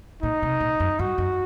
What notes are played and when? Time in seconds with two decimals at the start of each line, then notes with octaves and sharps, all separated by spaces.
0.23 A#2 D#4
0.42 C3
0.60 A#2
0.80 F#2
0.99 G2 F#4
1.18 F#2